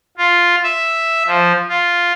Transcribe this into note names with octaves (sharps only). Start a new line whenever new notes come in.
F4
E5
F3
F4